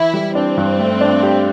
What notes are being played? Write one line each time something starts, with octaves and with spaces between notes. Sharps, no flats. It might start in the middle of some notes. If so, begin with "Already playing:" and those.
Already playing: E3 E4
G3
C4 D4
G2
A3
D4
G4